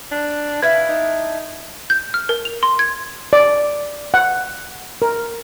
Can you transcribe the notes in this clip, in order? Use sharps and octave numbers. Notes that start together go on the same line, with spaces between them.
D4
D4 E4 B4 F5 G#6
D#4
G6
F6
A#4
F7
C6
G#6
D5
F#5
A#4